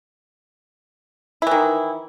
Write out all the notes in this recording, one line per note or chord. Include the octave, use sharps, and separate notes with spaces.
D#3 E3 E4